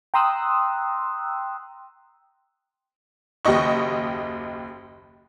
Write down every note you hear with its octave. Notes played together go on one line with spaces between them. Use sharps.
G5 A#5 C6 D#6 E6 F#6
F#1 D#2 G4 D#5 C#6